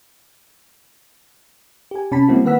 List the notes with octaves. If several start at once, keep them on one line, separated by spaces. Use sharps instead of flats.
G4 G#5
C3 C#4 A5 B5 B6
G3 G#3 A#3 C4 E4 F#4
D#3 A#3 B4 F#5 E6 B6